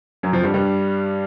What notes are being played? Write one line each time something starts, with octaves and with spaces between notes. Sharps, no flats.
F#2 F#3
F2 F3
G2 G3
G2 G3